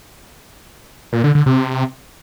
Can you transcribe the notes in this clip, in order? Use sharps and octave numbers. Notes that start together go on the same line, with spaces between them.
A#2
D3
D3
C3